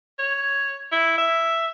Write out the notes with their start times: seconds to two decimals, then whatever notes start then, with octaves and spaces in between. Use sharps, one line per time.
0.19 C#5
0.92 E4
1.18 E5